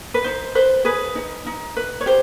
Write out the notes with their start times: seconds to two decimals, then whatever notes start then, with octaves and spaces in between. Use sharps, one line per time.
0.14 B4
0.24 D#4 C5
0.55 B4 C5
0.85 G#4 B4
1.15 D#4
1.46 D#4
1.76 B4
2.01 C#5
2.06 G4 C5